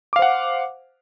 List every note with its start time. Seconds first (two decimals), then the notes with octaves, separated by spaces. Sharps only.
0.13 D6
0.16 F5
0.19 C5
0.22 F#5